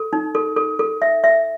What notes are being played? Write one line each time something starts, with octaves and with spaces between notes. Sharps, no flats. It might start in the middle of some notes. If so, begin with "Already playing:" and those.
Already playing: A4
D#4
A4
A4
A4
E5
E5